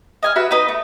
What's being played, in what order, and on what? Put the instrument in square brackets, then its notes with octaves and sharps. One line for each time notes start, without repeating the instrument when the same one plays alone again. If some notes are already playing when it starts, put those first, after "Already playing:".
[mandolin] D#5 G#5 F6
F#4 B4 E5
D#4 B4 D#5
A3